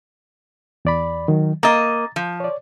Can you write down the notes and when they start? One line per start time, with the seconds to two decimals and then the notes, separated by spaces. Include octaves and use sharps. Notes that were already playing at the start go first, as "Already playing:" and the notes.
0.85 E2 D5 B5
1.28 D#3 F#3
1.63 A#3 D#5 A#5 A6
2.16 F3
2.40 C#5 D5